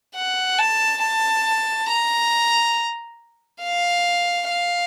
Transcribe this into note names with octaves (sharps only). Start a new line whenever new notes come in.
F#5
A5
A5
A#5
F5
F5